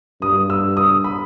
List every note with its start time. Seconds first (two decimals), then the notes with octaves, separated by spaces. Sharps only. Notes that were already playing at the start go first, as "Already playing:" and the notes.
0.22 G2 D#6
0.50 E6
0.77 D#6
1.04 B5